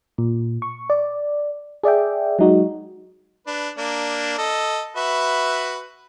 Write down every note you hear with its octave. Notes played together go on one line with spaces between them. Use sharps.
A#2
C#6
D5
G#4 D5 E5 G5
F#3 G#3 D#4 F#4
D4 B4
A#3 D4
A4 D#5
F#4 B4 E5